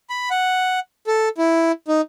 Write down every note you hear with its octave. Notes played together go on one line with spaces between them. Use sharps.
B5
F#5
A4
E4
D#4